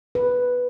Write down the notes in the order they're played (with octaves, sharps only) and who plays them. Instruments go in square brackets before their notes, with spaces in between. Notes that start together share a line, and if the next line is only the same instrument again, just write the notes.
[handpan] B4